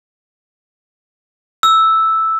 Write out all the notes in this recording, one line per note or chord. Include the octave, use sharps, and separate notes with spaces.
E6